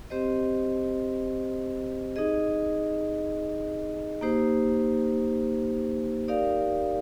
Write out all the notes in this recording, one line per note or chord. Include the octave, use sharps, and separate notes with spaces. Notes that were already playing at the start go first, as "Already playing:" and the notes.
C4 G4 C5 D#5
D#4 G#4 D#5
A#3 D#4 G4 C5
D#4 G4 A#4 D5 F5